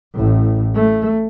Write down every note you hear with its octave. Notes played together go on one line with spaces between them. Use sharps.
A1 A2
A3